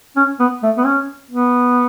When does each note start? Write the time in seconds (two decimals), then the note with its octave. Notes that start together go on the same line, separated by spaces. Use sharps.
0.16 C#4
0.40 B3
0.63 A3
0.77 B3
0.85 C#4
1.31 B3